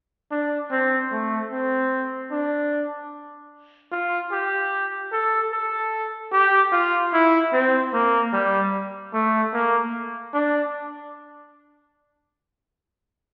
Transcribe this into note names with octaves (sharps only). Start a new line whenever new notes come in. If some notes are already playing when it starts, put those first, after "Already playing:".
D4
C4
A3
C4
D4
F4
G4
A4
A4
G4
F4
E4
C4
A#3
G3
A3
A#3
D4